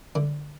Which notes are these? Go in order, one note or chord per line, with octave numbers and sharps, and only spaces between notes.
D3